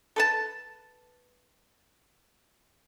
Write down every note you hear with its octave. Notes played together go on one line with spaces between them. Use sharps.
A4 B4 A5